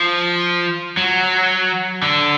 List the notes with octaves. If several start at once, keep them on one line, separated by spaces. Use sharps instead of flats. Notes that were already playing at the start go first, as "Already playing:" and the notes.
Already playing: F3
F#3
D3